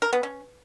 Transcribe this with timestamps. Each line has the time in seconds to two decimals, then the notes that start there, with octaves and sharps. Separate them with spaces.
0.02 A#4
0.13 B3
0.23 C#4